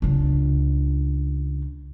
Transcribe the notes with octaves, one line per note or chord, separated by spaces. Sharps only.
C#2 D4